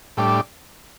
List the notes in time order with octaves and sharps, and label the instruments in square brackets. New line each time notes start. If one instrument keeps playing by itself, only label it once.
[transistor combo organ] A2 G3 D4